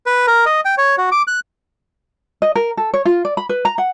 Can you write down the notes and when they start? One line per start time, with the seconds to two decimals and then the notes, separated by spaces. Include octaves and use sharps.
0.06 B4
0.27 A#4
0.46 D#5
0.65 G5
0.78 C#5
0.98 F#4
1.12 D6
1.27 F#6
2.42 D#5
2.56 A#4
2.77 A4
2.94 C#5
3.05 F4
3.25 D5
3.37 B5
3.49 B4
3.65 A#5
3.78 F#5